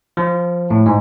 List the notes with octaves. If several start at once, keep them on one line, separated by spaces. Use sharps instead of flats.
F3
A2
G#2